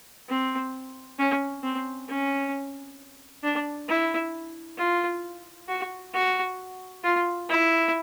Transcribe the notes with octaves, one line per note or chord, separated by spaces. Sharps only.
C4
C#4
C4
C#4
D4
E4
F4
F#4
F#4
F4
E4